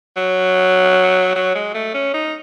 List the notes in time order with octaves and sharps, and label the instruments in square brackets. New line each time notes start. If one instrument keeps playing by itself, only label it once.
[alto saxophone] F#3
F#3
G#3
A3
C#4
D#4